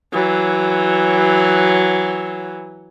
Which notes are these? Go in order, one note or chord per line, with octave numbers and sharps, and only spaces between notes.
E3 F#3